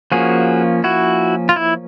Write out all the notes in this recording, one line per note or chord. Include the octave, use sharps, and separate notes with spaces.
F3 A#3 C#4 F#4 G#4
E4 F#4
F4
E4